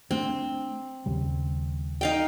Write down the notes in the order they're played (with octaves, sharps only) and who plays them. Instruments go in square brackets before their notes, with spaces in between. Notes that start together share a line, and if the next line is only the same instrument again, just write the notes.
[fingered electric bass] A3 D4 [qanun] C4
[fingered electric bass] D#2 C#3 G3
[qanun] D#4 F5 G5